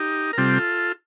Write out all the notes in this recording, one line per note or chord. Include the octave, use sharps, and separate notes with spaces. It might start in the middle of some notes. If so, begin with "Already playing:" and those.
Already playing: D#4 G4
A#4
C3 G3 C4 F4 A4